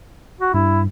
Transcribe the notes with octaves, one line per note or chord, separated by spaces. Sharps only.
F#4
G2 E4